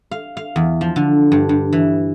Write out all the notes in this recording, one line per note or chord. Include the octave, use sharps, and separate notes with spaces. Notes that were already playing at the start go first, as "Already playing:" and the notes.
F5
F5
E2
F3
D3
G2
G2
E3